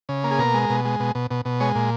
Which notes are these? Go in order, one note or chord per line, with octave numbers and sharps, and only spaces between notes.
C#3
A#3
G#4
B2 A#4
G#3
B2
G#3
B2
B2
B2
B2
G#3 C#5
A#2